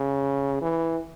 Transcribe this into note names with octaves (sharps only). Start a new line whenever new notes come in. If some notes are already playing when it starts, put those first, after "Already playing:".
Already playing: C#3
E3